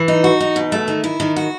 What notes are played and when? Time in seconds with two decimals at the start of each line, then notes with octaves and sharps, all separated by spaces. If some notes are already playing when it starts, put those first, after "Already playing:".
Already playing: E3
0.08 D#4
0.24 F#4
0.40 D#4
0.56 B2
0.72 A3
0.88 D#3
1.04 E4
1.20 D#3
1.36 F#4